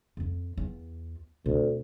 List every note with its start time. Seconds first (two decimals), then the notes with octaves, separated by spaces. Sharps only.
0.17 F2 C4
0.57 E2 F4
1.46 D2 B2 C4